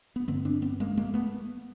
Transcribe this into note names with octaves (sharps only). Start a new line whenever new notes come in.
B3
G2 D3 A#3 C4
C4 D4
B3 C#4
G#3 A#3
G#3 A#3
A3 B3